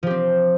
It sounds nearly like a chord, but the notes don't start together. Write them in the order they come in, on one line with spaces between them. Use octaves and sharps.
F3 G4 C4